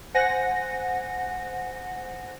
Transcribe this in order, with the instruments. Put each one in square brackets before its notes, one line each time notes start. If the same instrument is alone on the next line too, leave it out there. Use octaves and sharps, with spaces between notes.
[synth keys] C5 F#5 G#5 A#6